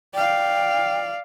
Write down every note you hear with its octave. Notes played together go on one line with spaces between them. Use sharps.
D5 F5 G5